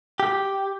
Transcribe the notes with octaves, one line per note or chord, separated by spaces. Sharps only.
G4